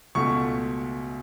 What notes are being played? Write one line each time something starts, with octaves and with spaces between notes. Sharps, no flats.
C#2 B2 A3 C#6